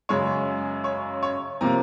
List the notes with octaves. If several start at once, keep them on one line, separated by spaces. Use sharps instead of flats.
F#2 C#3 G#3 C#5
C#5
C#5
C3 F3 A#3 A#5